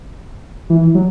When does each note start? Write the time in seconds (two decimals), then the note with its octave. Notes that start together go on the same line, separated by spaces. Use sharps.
0.70 E3
0.95 F#3